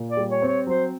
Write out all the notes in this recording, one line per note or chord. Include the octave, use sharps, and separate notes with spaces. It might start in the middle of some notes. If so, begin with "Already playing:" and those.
Already playing: A#2
D5
G3
C#5
C4
C#5
F#3 C5